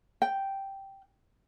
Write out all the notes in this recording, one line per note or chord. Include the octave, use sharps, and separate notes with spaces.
G5